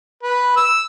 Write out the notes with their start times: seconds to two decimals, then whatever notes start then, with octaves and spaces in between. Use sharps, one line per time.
0.23 B4
0.57 E6